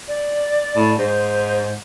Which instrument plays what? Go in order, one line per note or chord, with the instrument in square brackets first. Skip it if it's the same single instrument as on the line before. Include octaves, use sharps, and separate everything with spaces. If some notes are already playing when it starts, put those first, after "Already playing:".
[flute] D5
[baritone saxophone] A2
[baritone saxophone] G#2 [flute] C5